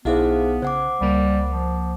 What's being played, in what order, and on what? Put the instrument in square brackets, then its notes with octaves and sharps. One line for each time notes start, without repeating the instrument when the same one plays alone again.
[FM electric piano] B1 E4 F5 [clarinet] B3 [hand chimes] D#4 G#4 C5
[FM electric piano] C#3 [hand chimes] C5 F#5 D6
[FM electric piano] C#2 A#3 [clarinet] G3
[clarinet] F3